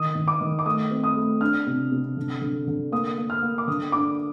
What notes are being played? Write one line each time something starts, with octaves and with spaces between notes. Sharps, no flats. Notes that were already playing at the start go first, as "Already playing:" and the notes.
Already playing: D#3 D#6
D#3
D6
D#3
D6
A3 D#6
C4
D#6
A3
D4 F6
C3
C3
D3
D3
D3
A#3 D#6
A#3
F6
A#3
D6
D3 D#6
D4 D6